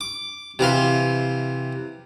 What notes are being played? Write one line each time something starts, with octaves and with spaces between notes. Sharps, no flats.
D6
C3 E3 F5 C6